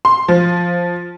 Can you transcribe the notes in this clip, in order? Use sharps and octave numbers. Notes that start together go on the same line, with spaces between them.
C6
F3